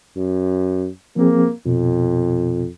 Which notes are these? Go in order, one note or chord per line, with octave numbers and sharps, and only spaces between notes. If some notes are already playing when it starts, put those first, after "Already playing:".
F#2
F3 A#3 C4 G#4
F2 B2